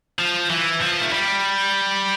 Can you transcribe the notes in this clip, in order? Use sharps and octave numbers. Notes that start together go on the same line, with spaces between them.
F3
E3
F3
A3
G3